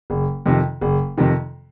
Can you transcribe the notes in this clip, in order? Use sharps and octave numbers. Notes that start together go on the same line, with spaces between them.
F#1
F2 C3 D#3
F#1
F2 C3 D#3